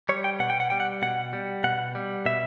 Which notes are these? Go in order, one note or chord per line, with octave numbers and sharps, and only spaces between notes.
G3 C#5
G5
B2 F#5
G5
F#5
G3 G5
F#5
B2 F#5
G3
B2 F#5
G3
B2 E5